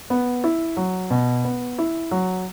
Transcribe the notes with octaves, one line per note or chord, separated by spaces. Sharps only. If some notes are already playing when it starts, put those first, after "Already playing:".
B3
E4
F#3
B2
B3
E4
F#3